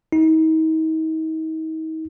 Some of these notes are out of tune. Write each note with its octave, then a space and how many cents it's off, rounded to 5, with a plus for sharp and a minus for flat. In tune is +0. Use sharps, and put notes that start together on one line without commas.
D#4 +40